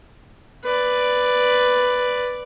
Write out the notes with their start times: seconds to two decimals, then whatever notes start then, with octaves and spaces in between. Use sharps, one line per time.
0.65 B4 D5